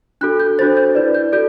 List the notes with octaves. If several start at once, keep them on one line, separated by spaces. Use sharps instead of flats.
D4 F#4 A4 F#6
G6
D4 F#4 A4 C5 A6
G6
E4 B4 D5
G6
F#4 A4 D5 G6